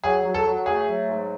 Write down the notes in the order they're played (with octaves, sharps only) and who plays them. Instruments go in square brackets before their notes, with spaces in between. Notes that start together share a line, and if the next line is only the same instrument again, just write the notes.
[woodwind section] F#3 [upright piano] G#4
[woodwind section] F#3
[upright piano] A4
[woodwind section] F#3
[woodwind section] A3 [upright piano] G#4
[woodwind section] F#3
G#2